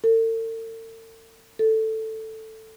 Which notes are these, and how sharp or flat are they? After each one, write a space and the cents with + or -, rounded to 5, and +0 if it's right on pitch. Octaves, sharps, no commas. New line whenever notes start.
A4 +45
A4 +5